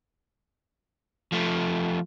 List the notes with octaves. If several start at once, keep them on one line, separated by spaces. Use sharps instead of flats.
F3 A3